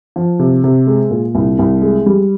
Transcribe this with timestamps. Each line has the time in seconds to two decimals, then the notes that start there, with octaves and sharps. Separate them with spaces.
0.16 F3
0.39 C3
0.64 C3
0.87 G#3
1.10 A#2
1.35 C2
1.59 C2
1.82 G#3
2.06 G3